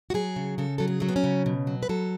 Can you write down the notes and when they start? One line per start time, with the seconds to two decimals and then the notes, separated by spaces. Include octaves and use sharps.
0.10 F#4
0.14 F#3 G#4
0.36 C#3
0.58 C#3 A4
0.78 F#3 A4
0.88 G#4
1.00 F#3 A3
1.09 B3
1.16 C#4
1.24 C#3
1.46 B2
1.67 F#3
1.83 B4
1.89 F#3 A4